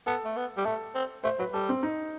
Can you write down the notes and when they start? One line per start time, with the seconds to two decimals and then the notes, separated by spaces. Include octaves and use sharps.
0.07 B3 A4
0.25 A3
0.36 B3
0.57 G3
0.65 A3 A4
0.95 C4
1.24 A3 C5
1.39 F#3 B4
1.53 G3 A4
1.69 C4
1.83 D#4